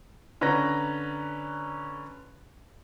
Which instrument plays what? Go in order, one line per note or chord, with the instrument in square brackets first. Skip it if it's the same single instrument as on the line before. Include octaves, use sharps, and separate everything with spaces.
[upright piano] D3 C#4 B4 A#5 A#6